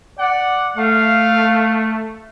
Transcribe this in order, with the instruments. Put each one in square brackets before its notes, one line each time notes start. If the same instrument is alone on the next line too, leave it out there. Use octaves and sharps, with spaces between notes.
[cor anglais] D5 [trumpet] F#5
[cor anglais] A3 [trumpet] F5